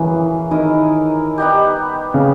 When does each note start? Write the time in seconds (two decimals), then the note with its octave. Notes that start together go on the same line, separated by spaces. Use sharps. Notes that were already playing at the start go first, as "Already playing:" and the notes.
Already playing: E3 A#3 C#4 G#4 B4
0.51 D#3 E4 A#4 D#5
1.38 G3 B3 D#4 G4
2.14 C#3